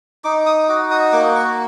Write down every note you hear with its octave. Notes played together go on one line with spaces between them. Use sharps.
D#4 D6
D#6
F#4 D6
D#6
A#3 D6
C#6